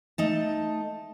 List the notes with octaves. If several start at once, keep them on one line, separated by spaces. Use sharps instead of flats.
A3 D#4 A5